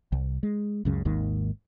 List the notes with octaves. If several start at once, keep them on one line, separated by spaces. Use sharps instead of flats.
C2
G#3
C#2 F#2 C#3
G#1 D#2 G#2 D#3